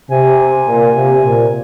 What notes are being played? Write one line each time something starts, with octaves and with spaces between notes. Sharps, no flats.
C3 G#5
A#2
C3
A#2